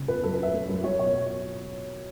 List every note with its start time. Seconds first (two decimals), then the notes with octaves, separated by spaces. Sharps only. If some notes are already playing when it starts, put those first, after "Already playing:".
Already playing: C#3
0.08 E2 B4
0.23 F#2 A4
0.34 B4
0.39 C#4 E5
0.53 A3
0.68 F#2
0.83 F#3 C#5
0.98 B2 C#5